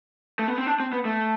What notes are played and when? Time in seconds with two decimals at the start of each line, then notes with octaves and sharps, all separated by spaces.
0.39 A3
0.48 B3
0.58 C4
0.66 D4
0.80 C4
0.93 B3
1.05 A3